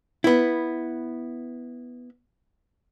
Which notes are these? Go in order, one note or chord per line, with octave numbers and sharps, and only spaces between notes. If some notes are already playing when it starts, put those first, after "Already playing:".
B3 E4